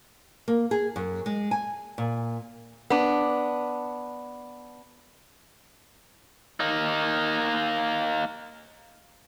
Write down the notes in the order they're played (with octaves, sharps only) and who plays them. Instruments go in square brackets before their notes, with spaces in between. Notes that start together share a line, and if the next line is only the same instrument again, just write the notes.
[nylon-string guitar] A#3
G#4
F#2
G#3
G#5
A#2
[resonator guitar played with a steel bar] B3 D4
[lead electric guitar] A#3 D#4